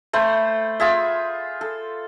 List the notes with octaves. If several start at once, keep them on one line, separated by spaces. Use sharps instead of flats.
A3 C5 B5
F4 G#4 E5
A4